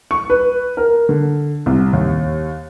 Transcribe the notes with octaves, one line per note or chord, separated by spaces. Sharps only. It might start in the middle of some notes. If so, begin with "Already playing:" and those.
C#6
B4
A#4
D3
C2
D#2